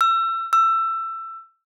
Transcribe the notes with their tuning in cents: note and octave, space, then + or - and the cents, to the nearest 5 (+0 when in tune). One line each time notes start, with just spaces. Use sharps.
E6 +30
E6 +20